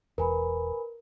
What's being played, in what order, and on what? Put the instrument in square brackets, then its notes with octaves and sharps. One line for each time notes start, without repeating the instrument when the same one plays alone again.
[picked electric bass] E1 [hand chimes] A#4 [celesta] B4 G#5 B5